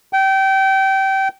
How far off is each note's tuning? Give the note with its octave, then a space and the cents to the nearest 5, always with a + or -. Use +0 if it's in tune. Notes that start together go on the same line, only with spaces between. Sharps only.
G5 -25